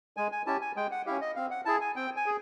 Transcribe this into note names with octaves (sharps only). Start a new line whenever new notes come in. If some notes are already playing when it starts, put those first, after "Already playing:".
G#3 G#5
G#5
C#4 E4 G4 A5
G#5
G#3 G5
F#5
C#4 E4 G4 F5
D#5
C4 F5
F#5
E4 G#4 A5
G#5
C4 G5
G#5
G#4